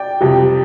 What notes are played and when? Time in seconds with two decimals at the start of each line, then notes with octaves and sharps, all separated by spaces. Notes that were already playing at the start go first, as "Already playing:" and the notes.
Already playing: D5 G5
0.21 F2 C3 G3